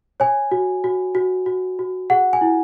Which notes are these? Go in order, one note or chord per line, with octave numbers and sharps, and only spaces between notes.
C#5 G#5
F#4
F#4
F#4
F#4
F#4
G#4 F#5
G#5
E4